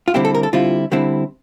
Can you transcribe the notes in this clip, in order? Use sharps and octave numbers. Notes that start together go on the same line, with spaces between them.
F4
D3 G3 C4 E4 G4
A4
A#4
A4
D3 G3 C4 E4 F4
D3 G3 C4 E4